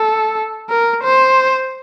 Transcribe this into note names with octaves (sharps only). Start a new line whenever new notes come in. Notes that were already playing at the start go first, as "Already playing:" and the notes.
Already playing: A4
A#4
C5